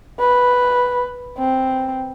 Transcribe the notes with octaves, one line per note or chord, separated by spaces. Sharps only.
B4
C4